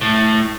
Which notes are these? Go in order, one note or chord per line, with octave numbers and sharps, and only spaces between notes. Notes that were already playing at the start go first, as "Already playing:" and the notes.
A2